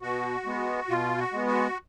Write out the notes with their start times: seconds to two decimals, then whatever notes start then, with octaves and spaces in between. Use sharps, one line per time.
0.02 B2 F#4
0.45 G#3 B3
0.89 B2 F4
1.18 F#4
1.33 G#3 B3
1.47 F#4